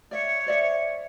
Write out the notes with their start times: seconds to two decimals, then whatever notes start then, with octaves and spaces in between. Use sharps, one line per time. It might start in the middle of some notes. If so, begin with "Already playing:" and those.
0.11 C#5 D5 E5
0.46 C5 D5 E5